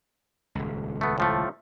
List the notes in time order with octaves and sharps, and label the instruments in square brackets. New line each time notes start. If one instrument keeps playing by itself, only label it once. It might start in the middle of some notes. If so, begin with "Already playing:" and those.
[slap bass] D#1 C#2
[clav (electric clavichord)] A3 B3
A2 F3 A3